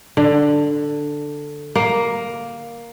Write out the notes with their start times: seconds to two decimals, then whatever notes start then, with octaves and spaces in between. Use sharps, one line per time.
0.17 D3
1.75 A#3